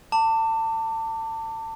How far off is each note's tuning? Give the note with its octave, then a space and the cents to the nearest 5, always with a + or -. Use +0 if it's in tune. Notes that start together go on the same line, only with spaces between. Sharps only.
A5 +30 D6 +0